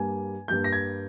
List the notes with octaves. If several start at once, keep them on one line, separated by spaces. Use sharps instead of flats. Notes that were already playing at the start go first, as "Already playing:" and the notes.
Already playing: G2 G3 A#3 G#5
G2 G3 A#3 G6
A#6
G#6